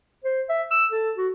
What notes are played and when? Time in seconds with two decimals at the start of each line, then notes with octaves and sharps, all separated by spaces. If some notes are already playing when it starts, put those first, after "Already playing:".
0.24 C5
0.49 E5
0.71 E6
0.92 A4
1.17 F#4